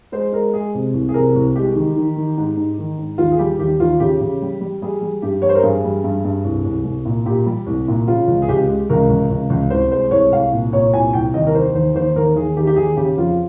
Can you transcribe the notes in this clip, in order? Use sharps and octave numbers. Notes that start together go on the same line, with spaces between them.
G#3 C5
G#3 A#4
G#3 G#4
C3
C2
G#4
C3 A#4
C2
G#3 G4
D#3
D#3
D#3
G#2
G#2
D#3
G#2
D#2 F4
G#4
G3 G4
D#2 G4
D#2 F4
C#3 G4
C#3
G3
G3
G3 G#4
G3
G2 G4
G3 C#5
C5
A#4
G2 G#4
G3
G2
G2
C2
C2
C2
A#2
A#2 G4
G3
C2
A#2
C#3 F4
C#2
G#4
C#2 G4
G#3
C#2 A#4
C#2
C#2
C#2
C2 C5
G#3 C5
C2 C#5
C2 F5
A#2
A#2 C#5
C2 G#5
C2 G5
D#2 D#5
A#4
D#3 C5
D#2 C5
D#2 C5
D#2 A#4
D#2 G#4
D#3 G4
G4
D#2 G#4
C#3 G4
F2 F4